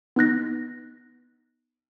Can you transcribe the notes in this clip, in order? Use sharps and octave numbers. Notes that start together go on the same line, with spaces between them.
B3 D#4 F#6 A#6